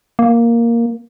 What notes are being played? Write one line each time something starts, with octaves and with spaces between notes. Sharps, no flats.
A#3